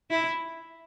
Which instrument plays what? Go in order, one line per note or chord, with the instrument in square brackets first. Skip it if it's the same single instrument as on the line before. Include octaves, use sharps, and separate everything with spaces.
[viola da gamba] E4